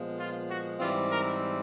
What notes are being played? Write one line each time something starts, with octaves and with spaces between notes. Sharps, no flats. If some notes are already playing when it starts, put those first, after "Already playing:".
Already playing: A#2 F3 G#3 B3
F4
F#4
G#2 E3 G3 C4 F4
A#4